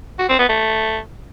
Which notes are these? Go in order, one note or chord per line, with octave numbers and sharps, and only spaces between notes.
F#4
C4
B3
A3